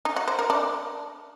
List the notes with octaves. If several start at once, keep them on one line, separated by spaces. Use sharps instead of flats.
D#4
F#4
C5
A#4
D4